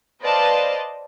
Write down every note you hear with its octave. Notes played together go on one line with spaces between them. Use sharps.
B4 C5 D5 D#5 F5 A5